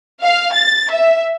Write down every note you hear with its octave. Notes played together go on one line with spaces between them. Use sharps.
F5
A6
E5